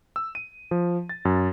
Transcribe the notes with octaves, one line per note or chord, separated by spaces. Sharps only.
E6
D#7
F3
A6
F#2